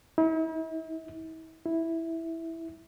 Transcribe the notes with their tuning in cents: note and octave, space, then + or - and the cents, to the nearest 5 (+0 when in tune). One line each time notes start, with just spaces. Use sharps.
E4 -45
E4 -5